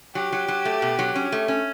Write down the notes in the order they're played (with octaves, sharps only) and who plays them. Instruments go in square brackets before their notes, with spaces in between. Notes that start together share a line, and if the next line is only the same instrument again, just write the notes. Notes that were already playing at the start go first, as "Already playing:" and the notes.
[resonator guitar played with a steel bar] F#3 [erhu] G4
[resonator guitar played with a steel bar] F#3
F#3
A3
B2
F#3
C#4
A3
C#4